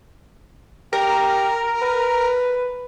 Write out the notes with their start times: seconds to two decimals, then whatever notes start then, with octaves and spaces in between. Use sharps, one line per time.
0.93 G4 A#4
1.82 B4